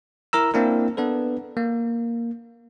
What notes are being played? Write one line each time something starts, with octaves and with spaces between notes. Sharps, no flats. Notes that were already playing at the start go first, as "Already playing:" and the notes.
E4 A#4 A#5 E6
A#3 C4 D4 E4 A#4
B3 D4 A4 B4
A#3